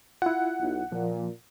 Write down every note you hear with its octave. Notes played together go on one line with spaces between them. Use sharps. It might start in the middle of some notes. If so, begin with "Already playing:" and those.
E4 F4 F#5
B1
A#2 F3